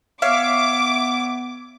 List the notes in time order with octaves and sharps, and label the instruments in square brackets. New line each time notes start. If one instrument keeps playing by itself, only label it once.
[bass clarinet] B3 [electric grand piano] C#5 E5 [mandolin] F5 [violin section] D6